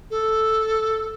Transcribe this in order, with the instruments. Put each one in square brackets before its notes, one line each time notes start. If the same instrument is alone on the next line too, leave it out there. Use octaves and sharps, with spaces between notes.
[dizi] A4